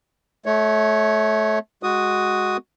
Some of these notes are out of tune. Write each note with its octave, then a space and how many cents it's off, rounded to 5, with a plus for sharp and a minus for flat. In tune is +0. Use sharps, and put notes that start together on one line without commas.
A3 -25 C#5 +0
G#3 +0 F#4 +0 D#6 +0